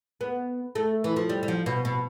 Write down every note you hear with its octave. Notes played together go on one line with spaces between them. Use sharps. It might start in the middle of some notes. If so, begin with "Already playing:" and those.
B3
A3
E3
F3
G3
G3
F3
B2
B2